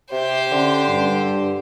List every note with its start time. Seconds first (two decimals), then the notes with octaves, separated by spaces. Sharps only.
0.12 C3 G4 C5
0.52 D3 C#4
0.88 G2